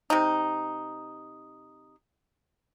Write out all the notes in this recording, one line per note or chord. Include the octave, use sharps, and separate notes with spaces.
C3 D#4